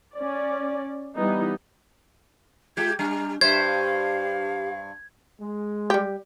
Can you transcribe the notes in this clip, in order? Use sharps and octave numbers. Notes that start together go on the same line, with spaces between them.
C#4 D5
E3 G3 B3 D#4
G#3 F4 G4 G#6
G3 D4 A#5
G2 G4 C5 E5 G#6
F5
G#3
G3 G4